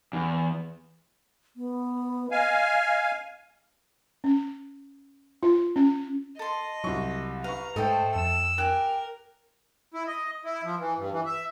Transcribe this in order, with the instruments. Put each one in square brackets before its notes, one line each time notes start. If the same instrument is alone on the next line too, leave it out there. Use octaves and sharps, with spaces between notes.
[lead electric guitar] E2
[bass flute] B3
[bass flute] D#5 [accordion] F5 G#5
[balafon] C#4
F4
C#4
[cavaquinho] A4 C6 [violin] D#5
[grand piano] C2 C#6 [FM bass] F#3
[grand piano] B4 C#6 [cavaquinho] F5 [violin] A#5
[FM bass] G#2 [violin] A3 C5 [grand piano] A4 [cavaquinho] D#5 G5
[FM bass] F2 [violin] E6
[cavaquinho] G4 G#5 [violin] A#4 [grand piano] F#6
[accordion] E4
D#5
E4
F3
E3
G2
E3
E5